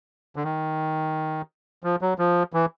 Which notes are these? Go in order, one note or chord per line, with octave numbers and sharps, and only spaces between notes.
D3
D#3
F3
F#3
F3
E3